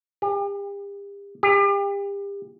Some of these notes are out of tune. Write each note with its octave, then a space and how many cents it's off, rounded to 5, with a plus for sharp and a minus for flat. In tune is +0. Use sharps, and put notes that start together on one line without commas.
G4 +40
G4 +35